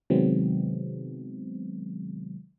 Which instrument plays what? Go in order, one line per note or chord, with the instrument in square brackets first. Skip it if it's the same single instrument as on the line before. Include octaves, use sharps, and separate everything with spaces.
[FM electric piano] C3 D#3 F#3 G#3 B3 C4